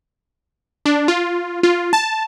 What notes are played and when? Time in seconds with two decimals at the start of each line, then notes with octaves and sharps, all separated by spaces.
0.86 D4
1.08 F4
1.63 F4
1.93 A5